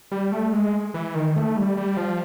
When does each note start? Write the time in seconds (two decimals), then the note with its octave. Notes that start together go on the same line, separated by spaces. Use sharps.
0.12 G3
0.32 A3
0.53 G#3
0.94 E3
1.15 D#3
1.36 A3
1.57 G3
1.77 G3
1.97 F3